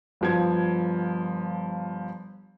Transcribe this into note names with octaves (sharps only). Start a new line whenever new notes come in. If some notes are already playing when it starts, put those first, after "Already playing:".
G1 F3 G#6